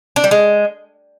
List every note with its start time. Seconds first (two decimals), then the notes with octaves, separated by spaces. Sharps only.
0.16 D4
0.24 G3
0.31 G#3